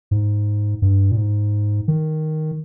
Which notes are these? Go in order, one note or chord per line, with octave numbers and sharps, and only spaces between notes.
G#2
G2
A#2
G#2
D#3